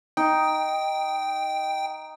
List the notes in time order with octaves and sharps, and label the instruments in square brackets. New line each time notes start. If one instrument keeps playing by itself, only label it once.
[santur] D#4 [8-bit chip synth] G5